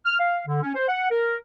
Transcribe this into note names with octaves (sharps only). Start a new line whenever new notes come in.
F6
F5
D3
C#4
C5
F#5
A#4